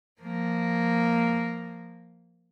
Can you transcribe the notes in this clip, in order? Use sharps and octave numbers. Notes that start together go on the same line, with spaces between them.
F3 A#3